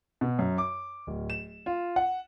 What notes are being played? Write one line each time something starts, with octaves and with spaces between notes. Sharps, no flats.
B2
F#2
D6
D1
E7
F4
F#5